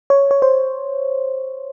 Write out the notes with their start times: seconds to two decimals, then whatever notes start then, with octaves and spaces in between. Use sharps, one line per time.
0.10 C#5
0.31 C#5
0.42 C5